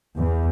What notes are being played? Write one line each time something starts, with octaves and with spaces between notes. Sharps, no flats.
E2